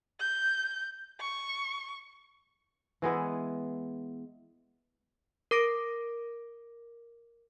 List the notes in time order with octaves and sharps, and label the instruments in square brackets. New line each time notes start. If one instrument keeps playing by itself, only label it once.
[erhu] G6
C#6
[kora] E3 G#3 B3 E4
[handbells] A#4 D6 A#6 D7